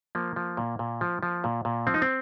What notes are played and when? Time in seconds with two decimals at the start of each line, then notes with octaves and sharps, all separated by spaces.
0.15 F3 A#3
0.36 F3
0.57 A#2
0.79 A#2
1.01 F3
1.23 F3
1.44 A#2
1.65 A#2
1.87 F3 C4
1.94 D#4
2.02 C4